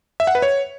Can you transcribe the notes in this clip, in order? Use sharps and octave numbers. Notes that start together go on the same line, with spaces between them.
E5
F#5
B4
C#5